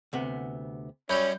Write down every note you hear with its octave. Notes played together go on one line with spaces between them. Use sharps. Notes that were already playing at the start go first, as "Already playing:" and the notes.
D2 C3 B3
F#2 F#3 G3 C#4 C#5 B5 G6